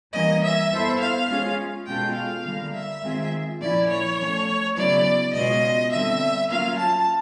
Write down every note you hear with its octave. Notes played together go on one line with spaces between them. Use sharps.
E3 G3 A#3 C#4 D#5
E5
B3 E4 A4 C5
F5
G#3 C#4 F4 G#4
B2 G#3 C#4 F4 A4 G5
F5
D3 G3 A#3
E5
D#3 G#3 C4 F4 G#4
A#2 F3 A#3 C#4 E4 D5
C#5
F3 A3 C#4
C#3 F#3 B3 E4 D5
B2 G#3 C#4 F4 D#5
D3 G3 C4 E5
F#3 A#3 C#4 F4 F5
A5